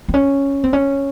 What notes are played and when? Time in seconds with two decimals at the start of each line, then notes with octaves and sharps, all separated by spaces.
0.08 C4
0.14 C#4
0.64 C4
0.73 C#4